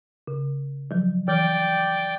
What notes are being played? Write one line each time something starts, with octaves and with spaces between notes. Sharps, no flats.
C#3
F3 F#3
E3 D5 G5